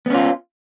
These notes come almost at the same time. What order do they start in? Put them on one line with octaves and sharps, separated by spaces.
B3 C#4 F4